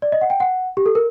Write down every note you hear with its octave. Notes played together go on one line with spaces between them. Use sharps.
D5
D#5
F#5
G5
F#5
G4
A4
A#4